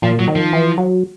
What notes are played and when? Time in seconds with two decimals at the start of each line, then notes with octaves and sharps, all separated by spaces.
0.02 A#2 F3
0.19 F#3
0.28 D#3
0.36 F3
0.53 E3
0.78 F#3